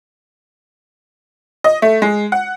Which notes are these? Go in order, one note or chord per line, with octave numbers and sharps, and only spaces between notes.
D#5
A3
G#3
F#5